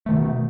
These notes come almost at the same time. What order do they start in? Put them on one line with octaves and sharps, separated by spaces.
A3 D#3 B2